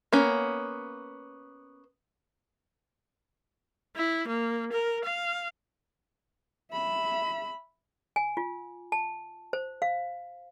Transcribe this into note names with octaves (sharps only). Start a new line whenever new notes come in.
A#3 B3 C#4
E4
A#3
A#4
F5
E5 B5
G#5
F4
A5
C5
F5